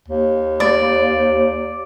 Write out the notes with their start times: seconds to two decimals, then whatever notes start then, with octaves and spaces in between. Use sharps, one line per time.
0.08 D#2
0.60 D5